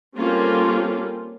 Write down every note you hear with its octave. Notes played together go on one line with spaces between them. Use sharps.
G3 A#3 C4 C#4 F4 A4